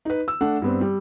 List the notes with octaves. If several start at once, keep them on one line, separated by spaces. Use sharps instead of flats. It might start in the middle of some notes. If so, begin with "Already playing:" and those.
D#4 B4
E6
A3 D4 F#5
G2 B3 C4
G3